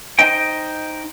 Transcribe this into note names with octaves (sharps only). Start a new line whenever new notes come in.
D#4 C5 D#5 G5